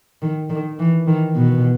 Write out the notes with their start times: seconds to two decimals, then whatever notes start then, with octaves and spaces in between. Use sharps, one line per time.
0.22 D#3
0.50 D#3
0.79 E3
1.07 D#3
1.36 B2